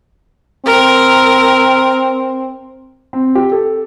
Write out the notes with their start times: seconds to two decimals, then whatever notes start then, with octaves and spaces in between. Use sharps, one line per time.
0.66 C4 A#4
3.13 C4
3.35 G4
3.52 A4